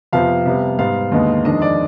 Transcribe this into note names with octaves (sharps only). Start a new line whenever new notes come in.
F2 C3 F3 B3 F5
C3 G3 B3
G#2 G3 B3 F5
D#2 D3 G#3 B3 D#4
F2 D#3 G#3 D4 D#5
D5